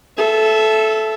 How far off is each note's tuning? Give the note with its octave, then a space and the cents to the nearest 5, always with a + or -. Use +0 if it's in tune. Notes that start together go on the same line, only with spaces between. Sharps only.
A4 -15 E5 +10